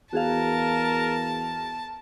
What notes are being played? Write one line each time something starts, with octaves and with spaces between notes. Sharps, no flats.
E2 F#4 G#4 A#4 F5 A5